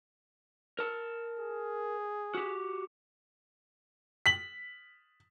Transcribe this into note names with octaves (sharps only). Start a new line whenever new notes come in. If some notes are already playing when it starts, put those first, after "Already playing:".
A#4 A5
G#4
F#4 G4
B6 F#7